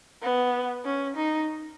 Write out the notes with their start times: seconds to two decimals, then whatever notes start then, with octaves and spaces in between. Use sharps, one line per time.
0.22 B3
0.85 C#4
1.16 D#4